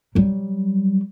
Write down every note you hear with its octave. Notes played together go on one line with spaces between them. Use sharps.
F#3 G3